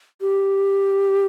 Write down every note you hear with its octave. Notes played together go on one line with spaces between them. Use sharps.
G4